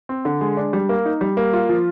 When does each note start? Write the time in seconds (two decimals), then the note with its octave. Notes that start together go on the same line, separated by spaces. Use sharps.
0.09 C4
0.25 D3
0.41 G#3
0.57 D4
0.73 G3
0.89 A#3
1.06 D#4
1.21 G3
1.37 A#3
1.53 F4
1.69 F3